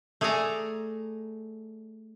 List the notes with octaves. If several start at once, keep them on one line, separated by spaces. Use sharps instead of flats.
A3 G#4 A4 D5 G#5 A#5